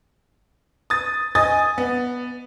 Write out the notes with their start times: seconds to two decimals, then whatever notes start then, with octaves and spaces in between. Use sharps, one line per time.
0.90 D#6 A6
1.35 D#5 G#5 D#6 A6
1.78 B3